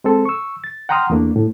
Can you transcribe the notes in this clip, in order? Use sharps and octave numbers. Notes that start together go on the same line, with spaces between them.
G#3 C4 A4
C#6 E6
A6
F#5 G5 A#5 C6 D#6 F6
E2 A3 A#3 D4
A2